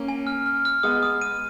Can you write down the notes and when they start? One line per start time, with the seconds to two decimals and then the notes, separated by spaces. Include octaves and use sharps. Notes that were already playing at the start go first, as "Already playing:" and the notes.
Already playing: A#3 C#4
0.08 G#5
0.27 F6
0.46 F6
0.65 F6
0.83 G#3 B3 D#6
1.03 D#6
1.22 D#7